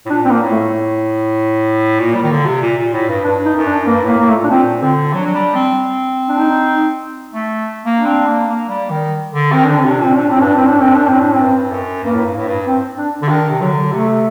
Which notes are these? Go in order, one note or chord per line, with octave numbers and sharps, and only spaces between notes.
A2
A#2 D4
C4
A#3
A2
A3
A#2 A#3
G3
D#3
D3
C3
A#2
A#2
A2
G2
G2 D4
D#4
F#2
D4
G2 A#3
A2 A#3
A2 A#3
A3
A#2
D4
A#2 C4
D3 C4
F#3 D4
F#3
G3
C4
D4
D#4
A3
A#3
D4
C4
A#3
A#3
G3
D#3
D3
D#3 C4
D3 D4
C4
C3
D4
A#2
C4
A#2 D4
A2 C4
G2 D4
A2 C4
D4
F#2 C4
D4
A2 C4
D4
C4
G2
F#2
G2 A#3
A2
G2
A2
G2
C4
D4
D3
D#3 D4
C3
D3 F#3
C3 A3
C3